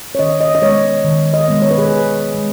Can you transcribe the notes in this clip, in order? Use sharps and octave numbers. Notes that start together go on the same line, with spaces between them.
C#5
D#3 D#5
D#5
D#5
G#3 B3 C#5
D#3
D#5
G#3 B3
C#5
B4
G#4
D#3 B4
G#3 B3